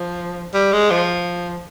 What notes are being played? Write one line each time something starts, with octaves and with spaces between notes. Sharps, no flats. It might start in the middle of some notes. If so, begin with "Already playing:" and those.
Already playing: F3
G3
G#3
F3